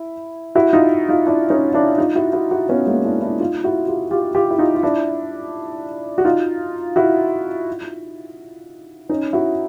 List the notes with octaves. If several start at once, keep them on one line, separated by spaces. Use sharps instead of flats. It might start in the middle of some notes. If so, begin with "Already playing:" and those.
Already playing: E4
E4 F#4
D#4 F4
D#4 F4
D4 E4
C#4 D#4
D4 E4
D#4 F4
E4 F#4
E4 F#4
E4 F#4
B3 C#4
G#3 A#3
D4 E4
D4 E4
D#4 F4
E4 F#4
F4 G4
F4 G4
F4 G4
E4
D#4 F4
F4
D4 E4
F#4
D#4 F4
E4 F#4
C#4 D#4
E4 F#4